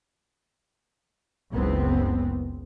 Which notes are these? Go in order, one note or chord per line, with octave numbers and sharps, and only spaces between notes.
F#1 C#2 B3 C4